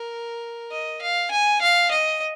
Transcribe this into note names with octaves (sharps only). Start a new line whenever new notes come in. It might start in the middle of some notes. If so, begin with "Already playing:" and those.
Already playing: A#4
D#5
F5
G#5
F5
D#5